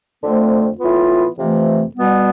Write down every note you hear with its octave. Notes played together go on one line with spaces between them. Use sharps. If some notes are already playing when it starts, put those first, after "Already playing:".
F2 D3 A3 C4
A2 E3 B3 F4
F2 C3 E3 A3
B2 G3 B3